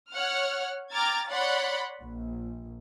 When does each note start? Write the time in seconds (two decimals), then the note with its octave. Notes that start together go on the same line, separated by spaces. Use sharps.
0.12 C#5 F#5 F6
0.92 G5 A#5 D6 F6 G#6 A6
1.29 C#5 D5 F#5 B5 C6
2.02 A#1